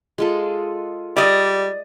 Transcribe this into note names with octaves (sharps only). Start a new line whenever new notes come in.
G#3 F4 A4
G3 D5 D#5